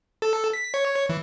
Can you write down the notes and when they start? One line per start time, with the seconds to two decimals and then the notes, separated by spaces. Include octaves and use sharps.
0.22 A4
0.53 B6
0.74 C#5
1.09 E3